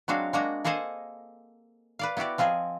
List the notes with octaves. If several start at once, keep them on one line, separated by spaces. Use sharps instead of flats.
F#3 G#3 C4 D4 F#4 F5
G#3 A#3 D4 F#4 D#5 A#5
A#3 G#4 A4 C5 D#5 A#5
B4 D5 F5
B3 E4 F#4 G4 D5
F3 C4 F4 G#4 D#5